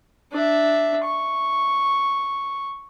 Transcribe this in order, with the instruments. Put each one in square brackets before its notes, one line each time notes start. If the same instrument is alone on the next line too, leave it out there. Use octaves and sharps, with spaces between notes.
[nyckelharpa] D4 E5
C#6